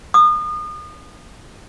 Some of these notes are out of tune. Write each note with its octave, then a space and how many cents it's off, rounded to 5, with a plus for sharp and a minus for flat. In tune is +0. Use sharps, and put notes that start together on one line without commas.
D#6 -35